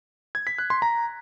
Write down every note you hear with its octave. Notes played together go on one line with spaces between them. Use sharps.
G#6
B6
F#6
C6
A#5